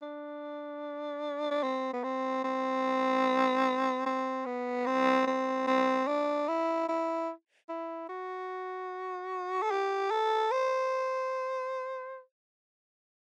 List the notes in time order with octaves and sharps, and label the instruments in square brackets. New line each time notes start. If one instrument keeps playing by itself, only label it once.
[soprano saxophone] D4
D4
C4
B3
C4
C4
C4
B3
C4
C4
C4
D4
E4
E4
E4
F#4
A4
G4
A4
C5